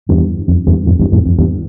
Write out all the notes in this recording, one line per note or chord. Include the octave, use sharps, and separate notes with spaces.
E2 G2
F2
E2 G2
F2 A2
E2 G2
F2 A2
F2
E2 G2